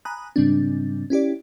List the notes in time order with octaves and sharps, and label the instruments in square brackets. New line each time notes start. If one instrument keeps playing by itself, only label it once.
[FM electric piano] G#5 A#5 B5 D#6 F#6
G#2 C#3 G3 C4 D4
C#4 E4 G4 D5